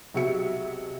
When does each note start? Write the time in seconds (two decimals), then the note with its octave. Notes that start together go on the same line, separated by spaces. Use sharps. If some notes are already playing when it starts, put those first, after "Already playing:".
0.14 B1 C3 F#4 G#4 E5 C#7